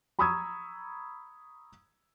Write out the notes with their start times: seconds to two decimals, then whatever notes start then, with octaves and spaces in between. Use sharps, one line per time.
0.19 A#5 B5 C#6 D#6 E6 G#6